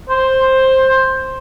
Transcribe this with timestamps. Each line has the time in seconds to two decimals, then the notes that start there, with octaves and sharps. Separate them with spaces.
0.09 C5